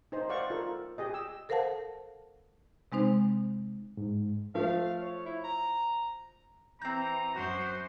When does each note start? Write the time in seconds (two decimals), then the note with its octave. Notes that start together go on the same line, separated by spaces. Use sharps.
0.12 D#4 C5
0.29 C5 D5 F5 F#5 C#6
0.50 F4 A4 A#4
0.98 G4 G#4 D#5
1.14 E6
1.49 A4 A#4 C5 F5 F#5 A5
2.92 C3 G#3 C4 D#4 C5
3.97 G#2
4.55 F3 A3 F5
5.01 C#5
5.26 E4
5.44 A#5
6.82 E3 C4 A#5 G6
7.35 F#2 F#4 C5